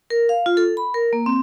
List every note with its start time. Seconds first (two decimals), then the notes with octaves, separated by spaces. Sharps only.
0.10 A#4
0.29 F5
0.46 F4
0.57 A4
0.77 B5
0.94 A#4
1.13 A#3
1.26 C4